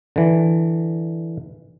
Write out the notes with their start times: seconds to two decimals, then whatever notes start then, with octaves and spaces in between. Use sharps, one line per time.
0.16 D3 E3